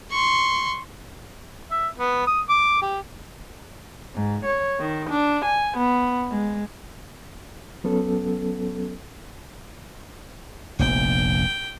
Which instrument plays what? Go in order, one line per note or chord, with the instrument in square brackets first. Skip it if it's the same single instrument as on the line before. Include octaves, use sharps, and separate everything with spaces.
[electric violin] C6 C#6
[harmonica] E5
B3
D#6
D6
G4
[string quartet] G#2
C#5
D#3
D4
G#5
B3
G#3
[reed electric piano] F#3 B3 C#4 A4
[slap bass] F1 A#1 B3 [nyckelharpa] G5